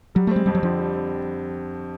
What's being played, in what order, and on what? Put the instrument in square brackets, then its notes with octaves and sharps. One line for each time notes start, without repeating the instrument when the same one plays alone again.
[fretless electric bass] F#3 [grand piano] G3
[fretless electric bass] A3
[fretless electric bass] G#3 [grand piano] C4
[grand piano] F2 [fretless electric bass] G3
[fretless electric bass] F#3
[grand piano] D3 [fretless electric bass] F3
[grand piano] G3
C4